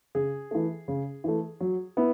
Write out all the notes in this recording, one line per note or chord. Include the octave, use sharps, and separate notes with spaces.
C#3 G#4
E3 A3
C#3
E3 A3
F#3
B3 E4